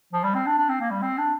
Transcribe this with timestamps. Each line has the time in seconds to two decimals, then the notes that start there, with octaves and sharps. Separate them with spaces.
0.13 F3
0.24 G3
0.35 C4
0.47 D4
0.58 D4
0.69 C4
0.81 A#3
0.91 G3
1.03 C4
1.18 D4